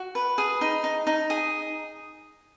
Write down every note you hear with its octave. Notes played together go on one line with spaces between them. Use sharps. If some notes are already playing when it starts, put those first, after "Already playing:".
Already playing: F#4
B4
G#4
D#4
D#4
D#4
G#4